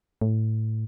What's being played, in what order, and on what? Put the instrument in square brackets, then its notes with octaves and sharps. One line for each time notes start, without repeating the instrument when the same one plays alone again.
[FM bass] A2